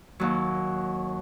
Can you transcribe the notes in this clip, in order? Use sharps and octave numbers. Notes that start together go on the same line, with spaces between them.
D#2 F#3